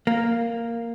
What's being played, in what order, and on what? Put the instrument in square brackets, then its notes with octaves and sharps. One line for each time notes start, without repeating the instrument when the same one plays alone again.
[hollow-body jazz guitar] A#3